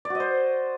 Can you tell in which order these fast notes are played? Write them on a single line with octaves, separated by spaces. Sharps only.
D5 F#4 D#5 C5